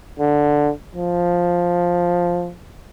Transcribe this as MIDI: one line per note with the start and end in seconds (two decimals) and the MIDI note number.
0.19 0.70 50
0.95 2.52 53